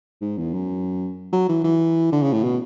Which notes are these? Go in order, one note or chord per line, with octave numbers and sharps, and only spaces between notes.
G#2
E2
F#2
F#3
E3
E3
D3
C#3
A2
B2